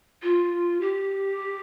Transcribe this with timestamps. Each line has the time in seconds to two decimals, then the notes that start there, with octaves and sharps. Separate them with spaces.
0.23 F4
0.81 G4